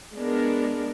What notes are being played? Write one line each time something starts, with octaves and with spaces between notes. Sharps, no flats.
G#3 B3 D4 A#4